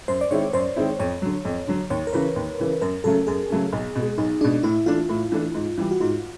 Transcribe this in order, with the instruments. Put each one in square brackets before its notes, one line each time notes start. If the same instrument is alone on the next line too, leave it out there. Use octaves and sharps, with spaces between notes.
[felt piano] F#2 [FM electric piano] C5
[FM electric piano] D5
[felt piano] D#3 G#3 C4 E4 [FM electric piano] C#5
[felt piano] F#2 [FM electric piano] C5
[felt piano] D#3 G#3 C4 E4
[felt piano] F2 [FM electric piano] C#5
[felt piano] D3 F#3
F2
D3 F#3
[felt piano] D#2 [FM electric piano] C#5
[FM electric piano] A#4
[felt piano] C#3 E3 [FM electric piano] B4
[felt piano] D#2
C#3 E3
[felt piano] F#2 [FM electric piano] A#4
[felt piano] C#3 F#3 A3 C#4 [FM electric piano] A4
[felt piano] F#2 [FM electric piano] G#4
[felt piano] C#3 F#3 A3 C#4
B1
B2 G#3
[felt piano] B1 [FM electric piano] D#4
[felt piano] B2 G#3 [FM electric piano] D4
[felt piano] A2 [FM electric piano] E4
[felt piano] E3 A3 D4 [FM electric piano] F4
[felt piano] A2
E3 A3 D4
G#2
E3 G3
[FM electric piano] F#4
[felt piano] G#2 [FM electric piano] F4